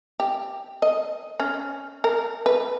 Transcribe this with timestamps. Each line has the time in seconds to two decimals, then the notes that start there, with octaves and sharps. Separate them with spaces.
0.20 G4
0.82 D#5
1.40 C#4
2.04 A#4
2.46 B4